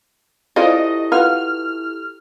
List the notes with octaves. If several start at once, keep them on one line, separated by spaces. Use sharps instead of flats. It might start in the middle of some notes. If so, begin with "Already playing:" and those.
E4 F4 G4 A4 C5 D5 D#5
F4 B4 F#5 F6